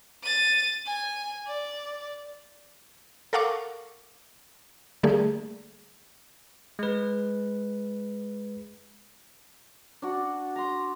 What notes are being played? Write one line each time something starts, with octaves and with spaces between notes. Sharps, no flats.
A6 D#7
G#5
D5
A4 A#4 F5 F#5 C#6 D6
D3 G3 A3 A#3 G#4
G#3 B4
D4 F#4
A#5 C6